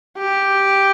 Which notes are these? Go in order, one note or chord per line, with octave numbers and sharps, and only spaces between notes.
G4